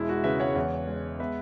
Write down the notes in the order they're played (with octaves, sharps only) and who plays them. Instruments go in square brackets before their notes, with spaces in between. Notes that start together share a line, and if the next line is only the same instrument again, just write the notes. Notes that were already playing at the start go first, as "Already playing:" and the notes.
Already playing: [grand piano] E1 G#3 E4
F#4
C#3 B4 E5
C#5 F#5
E2
G#3
B3 B4 E5